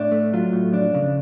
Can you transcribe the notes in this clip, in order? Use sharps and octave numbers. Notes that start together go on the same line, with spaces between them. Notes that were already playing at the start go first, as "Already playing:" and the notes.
Already playing: A2 D4
A3
F#3 F4
A2
F2 D4
C#3